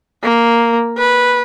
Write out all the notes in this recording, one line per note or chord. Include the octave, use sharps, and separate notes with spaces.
A#3
B4